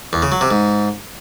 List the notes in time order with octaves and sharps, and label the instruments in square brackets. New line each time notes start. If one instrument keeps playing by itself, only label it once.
[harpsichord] E2
C#3
F#3
C3
G#2